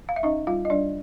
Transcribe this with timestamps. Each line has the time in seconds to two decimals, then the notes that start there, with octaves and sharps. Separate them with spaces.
0.09 F5
0.16 E5
0.23 C#4 D#4 D#5
0.47 G3 F4 F5
0.65 D#5
0.70 G3 D4 D5